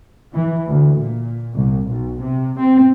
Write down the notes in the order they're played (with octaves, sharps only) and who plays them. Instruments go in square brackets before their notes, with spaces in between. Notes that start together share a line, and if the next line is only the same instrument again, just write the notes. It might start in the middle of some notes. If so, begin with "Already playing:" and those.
[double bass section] E3
D2
A#2
C2
B1
C3
C4